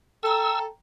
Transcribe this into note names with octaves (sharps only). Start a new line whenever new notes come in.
A4 G5 A#5 E6